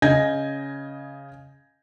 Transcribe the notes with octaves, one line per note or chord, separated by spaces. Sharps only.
C#3 D#5 G#5 G6 G#6 A#6